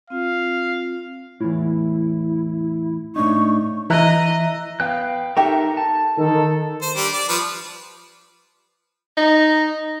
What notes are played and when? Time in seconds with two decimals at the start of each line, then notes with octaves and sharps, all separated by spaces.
0.10 C4 F4 F5
1.40 E2 A2 E4
3.16 A2 D4 D#4 C#6
3.90 E3 E4 D#5 E5 A#5 F#6
4.80 B3 F5 G5 F#6
5.37 D#4 G4 A4 A#4 E5 G5
5.77 A5
6.18 D#3 A4
6.82 C5
6.97 G3 D4
7.13 D5
7.29 F3 B4
9.17 D#4